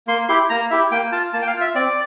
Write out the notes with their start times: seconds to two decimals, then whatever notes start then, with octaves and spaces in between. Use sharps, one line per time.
0.07 A#3 C6
0.29 E4 G4 C6
0.50 A#3 A#5
0.71 E4 G4 E5
0.92 A#3 G5
1.12 F4 A5
1.33 A#3 A5
1.42 G5
1.47 F5
1.54 F4
1.61 E5
1.75 C4 D5